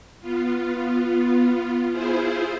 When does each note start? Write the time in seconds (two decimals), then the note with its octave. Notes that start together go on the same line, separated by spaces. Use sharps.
0.21 B3 F4
1.92 E4 F4 G#4 C5